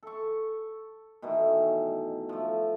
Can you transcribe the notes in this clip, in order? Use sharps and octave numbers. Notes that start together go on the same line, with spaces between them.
A4 C#6
B2 D#3 E3 A3
F3 A3